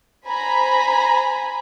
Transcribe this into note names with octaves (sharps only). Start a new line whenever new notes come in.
C5 G#5 A#5 B5